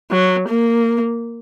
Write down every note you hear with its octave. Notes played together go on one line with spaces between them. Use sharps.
F#3
A#3